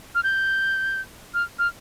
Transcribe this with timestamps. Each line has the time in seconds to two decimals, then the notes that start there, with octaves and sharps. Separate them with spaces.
0.15 F6
0.24 G6
1.34 F6
1.59 F6